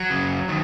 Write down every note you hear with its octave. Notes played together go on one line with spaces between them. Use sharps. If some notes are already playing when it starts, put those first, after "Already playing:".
Already playing: F#3
F#2 C#3
D#3